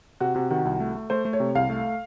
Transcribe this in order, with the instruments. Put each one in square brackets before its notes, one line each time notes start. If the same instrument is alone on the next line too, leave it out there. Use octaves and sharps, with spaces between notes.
[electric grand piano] C3 [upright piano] F#4
[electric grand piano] C3 [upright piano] F#4
[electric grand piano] D#3 [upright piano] F#4
[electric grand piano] C2
A3
A3
[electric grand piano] A3 [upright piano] C5
[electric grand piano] A3
[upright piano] C#5
[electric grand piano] C3
[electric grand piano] C2 [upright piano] F5
[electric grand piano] A3